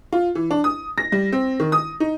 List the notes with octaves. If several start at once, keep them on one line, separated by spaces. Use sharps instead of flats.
F4
E3
D4
D#6
A#6
G3
C4
D#3
D#6
D#4